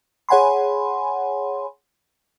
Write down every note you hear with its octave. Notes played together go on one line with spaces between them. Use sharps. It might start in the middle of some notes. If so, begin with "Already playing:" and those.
G#4 C#5 F#5 G#5 B5 C6